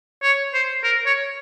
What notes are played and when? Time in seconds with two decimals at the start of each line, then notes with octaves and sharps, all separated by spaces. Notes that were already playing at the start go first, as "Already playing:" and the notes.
0.23 C#5
0.53 C5
0.84 A#4
1.06 C#5